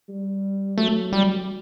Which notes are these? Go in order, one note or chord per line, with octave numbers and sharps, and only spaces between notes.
G3
F#3 A3
G3